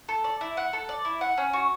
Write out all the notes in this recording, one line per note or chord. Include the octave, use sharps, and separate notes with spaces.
A4
D5
E4
F#5
A4
D5
E4
F#5
C#4
F#4